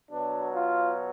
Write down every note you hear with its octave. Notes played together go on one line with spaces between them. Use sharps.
B2 F#3 D4
F4